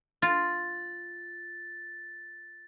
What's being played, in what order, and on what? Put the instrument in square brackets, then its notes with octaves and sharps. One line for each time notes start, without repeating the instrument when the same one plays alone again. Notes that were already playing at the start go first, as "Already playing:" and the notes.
[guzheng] F4 [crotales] A6